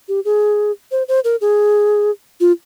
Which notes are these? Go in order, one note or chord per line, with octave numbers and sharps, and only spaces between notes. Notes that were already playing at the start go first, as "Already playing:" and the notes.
G4
G#4
C5
C5
A#4
G#4
F4